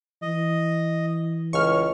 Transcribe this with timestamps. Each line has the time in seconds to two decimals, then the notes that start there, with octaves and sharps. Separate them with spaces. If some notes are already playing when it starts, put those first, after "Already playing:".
0.22 E3 D#5
1.53 C#2 A2 C#6 F6